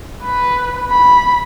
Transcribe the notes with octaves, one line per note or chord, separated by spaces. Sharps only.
B4
B5